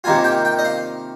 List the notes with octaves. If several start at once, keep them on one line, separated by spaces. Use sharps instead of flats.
C3 D#3 A#3 F4 G#5
G5
G5
D#5
F5